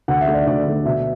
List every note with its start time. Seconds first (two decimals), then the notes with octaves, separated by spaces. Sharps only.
0.08 D2 F#5
0.21 E5
0.27 D3 A3
0.34 D5
0.47 D2 D5
0.65 D3 A3
0.85 B2 E5